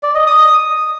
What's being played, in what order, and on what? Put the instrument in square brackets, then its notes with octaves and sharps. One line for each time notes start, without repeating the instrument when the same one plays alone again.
[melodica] D5
D#5
D#6